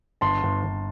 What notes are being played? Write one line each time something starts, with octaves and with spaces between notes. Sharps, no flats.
G1 A5 C6
G1
G1